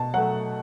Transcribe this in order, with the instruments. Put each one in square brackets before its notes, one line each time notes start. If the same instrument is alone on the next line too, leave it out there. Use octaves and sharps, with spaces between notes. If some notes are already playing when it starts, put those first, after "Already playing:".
Already playing: [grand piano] B2 A5
F#3 A3 F#5